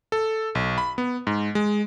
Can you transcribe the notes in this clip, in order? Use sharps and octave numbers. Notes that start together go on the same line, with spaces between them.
A4
B1
B5
B3
G#2
G#3